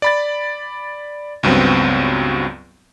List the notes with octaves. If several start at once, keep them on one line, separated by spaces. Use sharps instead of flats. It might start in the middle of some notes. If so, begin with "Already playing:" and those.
D5 B5 A6
C#2 G2 F#3 B3 C4